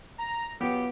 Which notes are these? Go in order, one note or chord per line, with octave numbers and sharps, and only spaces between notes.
A#5
F#3 B3 F4 G4